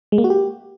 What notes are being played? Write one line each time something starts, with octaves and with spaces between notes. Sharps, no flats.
G#3
A#3
F#4
G4